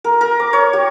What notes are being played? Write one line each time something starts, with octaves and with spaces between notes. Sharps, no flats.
A#4
A#4
D6
C#5
G4